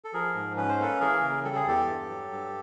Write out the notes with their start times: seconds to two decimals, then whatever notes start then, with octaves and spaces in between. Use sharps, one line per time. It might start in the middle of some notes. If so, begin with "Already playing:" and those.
0.05 A4
0.13 F3 G#4 A#4
0.35 G#2
0.57 C#4 B4
0.69 C5
0.79 A#3 A4 B4
1.00 E3 G#4 A#4
1.22 C#3
1.44 G3 A4
1.56 G#4
1.67 E2 G4 A4
1.88 G2
2.10 F#3
2.31 G2